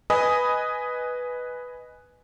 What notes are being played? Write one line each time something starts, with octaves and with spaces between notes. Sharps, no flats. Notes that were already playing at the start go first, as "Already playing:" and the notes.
B4 D#5 G#5 B5 D#6